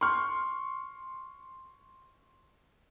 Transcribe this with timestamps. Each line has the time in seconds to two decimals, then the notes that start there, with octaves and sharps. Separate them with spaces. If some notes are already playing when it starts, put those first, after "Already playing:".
0.01 C6 C#6 F6